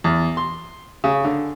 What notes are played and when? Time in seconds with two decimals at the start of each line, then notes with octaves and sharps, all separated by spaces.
0.04 E2
0.37 C6
1.04 C#3
1.25 D3